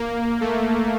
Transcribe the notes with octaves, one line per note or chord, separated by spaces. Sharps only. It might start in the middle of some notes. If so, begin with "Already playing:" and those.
Already playing: A#3
A3